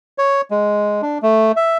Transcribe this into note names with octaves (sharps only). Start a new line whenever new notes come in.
C#5
G#3
D4
A3
E5